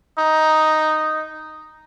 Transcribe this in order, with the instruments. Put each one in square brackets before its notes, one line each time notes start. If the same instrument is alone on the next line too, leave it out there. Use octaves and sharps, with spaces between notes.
[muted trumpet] D#4